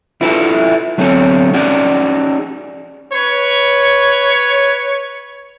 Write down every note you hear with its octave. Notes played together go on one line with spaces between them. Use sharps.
E4 F4 A4 B4 E5
D3 F#3 B3 C4 A4 C#5
C#4 D#4 F#4 G#4 D5
B4 C#5